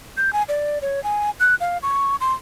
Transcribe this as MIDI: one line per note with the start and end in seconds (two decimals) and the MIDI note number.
0.17 0.33 91
0.33 0.43 80
0.49 0.79 74
0.82 1.02 73
1.04 1.30 80
1.40 1.55 90
1.60 1.78 77
1.83 2.16 85
2.21 2.33 84